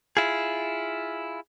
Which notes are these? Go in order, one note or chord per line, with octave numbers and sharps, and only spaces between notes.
E4 F4 G#4